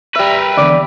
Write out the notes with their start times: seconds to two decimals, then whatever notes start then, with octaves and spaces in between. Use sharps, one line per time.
0.15 G3 A#4 B4 E5
0.57 E2 G2 D3 D5